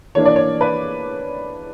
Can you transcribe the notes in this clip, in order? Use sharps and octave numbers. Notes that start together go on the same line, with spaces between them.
E3 A#3 D4 C#5
D5
C#5
B4